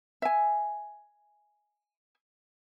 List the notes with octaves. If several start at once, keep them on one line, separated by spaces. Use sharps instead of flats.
E5 G#5